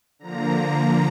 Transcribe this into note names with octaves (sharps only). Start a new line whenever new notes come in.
D3 F3 A#3 A#5